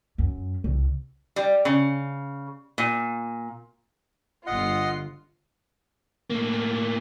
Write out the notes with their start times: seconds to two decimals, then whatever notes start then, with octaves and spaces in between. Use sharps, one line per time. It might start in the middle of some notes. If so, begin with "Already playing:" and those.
0.18 F#2
0.64 C2
1.36 G3
1.65 C#3
2.78 A#2
4.47 G1 F4 D#5 F#5 C7
6.30 A2 A#3